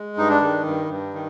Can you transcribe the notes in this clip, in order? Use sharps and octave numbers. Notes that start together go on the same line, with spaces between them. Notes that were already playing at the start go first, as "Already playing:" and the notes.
Already playing: G#3
G2 D#4
D4
D#3
G2
G2
D#3